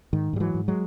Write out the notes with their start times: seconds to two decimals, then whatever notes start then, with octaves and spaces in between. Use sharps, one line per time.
0.13 G#2 D#3
0.33 G#2 G3
0.40 E3 F#3
0.54 G#2
0.68 F#3 G#3